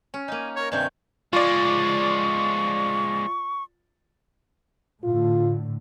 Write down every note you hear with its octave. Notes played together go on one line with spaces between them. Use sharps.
C#4
A#3 D#4 G#5
A#4 C#5
G2 C3 D#3 G#5 C#6 G6
F3 G#3 F4 D5 C#6
A2 D3 F4